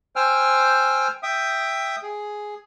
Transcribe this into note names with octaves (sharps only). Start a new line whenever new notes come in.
C5 G5 G#5 E6 F6
E5 G5 D#6
G#4